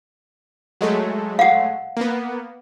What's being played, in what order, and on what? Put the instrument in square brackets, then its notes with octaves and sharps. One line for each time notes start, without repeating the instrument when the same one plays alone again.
[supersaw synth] F#3 G#3 A3
[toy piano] F5 F#5
[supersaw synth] A#3 B3